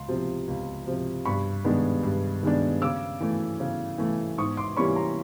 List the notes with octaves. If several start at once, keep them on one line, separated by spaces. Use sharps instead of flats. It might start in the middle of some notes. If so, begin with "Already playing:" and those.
Already playing: C#2 C6
C3 F3
C#2
C3 F3
G2 B5 C#6
D#3 G#3 B3 D4
G2
D#3 G#3 B3 D4
C#3 D6 E6
E3 A3
C#3
E3 A3
G#2 C#6 D#6
C6 D6
E3 G3 A#3 C#4 B5 C#6
A#5 C6